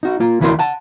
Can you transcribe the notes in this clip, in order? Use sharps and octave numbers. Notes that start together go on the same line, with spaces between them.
D#4 F#4
A#3 F4
D2 E3 E4 F#4 A#4 C6
F#5 A5